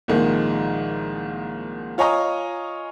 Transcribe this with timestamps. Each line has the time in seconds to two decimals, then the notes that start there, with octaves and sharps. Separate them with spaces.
0.08 C2 A#2 D#3 F3 G#3
1.98 F4 C#5 D#5 G#5 A#5 D#6